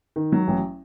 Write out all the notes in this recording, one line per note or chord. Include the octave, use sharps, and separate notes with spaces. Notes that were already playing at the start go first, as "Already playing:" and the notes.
D#3
F#3
A1